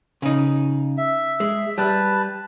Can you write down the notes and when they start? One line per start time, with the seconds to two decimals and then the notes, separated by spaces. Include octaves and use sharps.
0.22 C#3 D#4
0.97 E5
1.40 G#3
1.78 G3 B4 A5